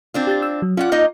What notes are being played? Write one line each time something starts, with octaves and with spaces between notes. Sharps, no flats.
C4 D4 F4
G4 G6 A6
E6
F#3
C#4 F4 D5 F#5
A#3 D#4 D#5